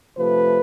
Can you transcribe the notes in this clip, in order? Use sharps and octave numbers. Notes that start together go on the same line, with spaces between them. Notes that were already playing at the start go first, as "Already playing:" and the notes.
C3 F3 A3 B4